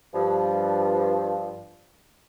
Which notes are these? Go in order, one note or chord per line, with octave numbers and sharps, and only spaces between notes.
G2 F3